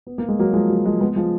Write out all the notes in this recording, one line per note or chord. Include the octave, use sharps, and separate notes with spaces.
B3
A#3
G#3
F#3 A#3
F3 G#3
F#3
F3 G#3
G#3 B3
F3 G#3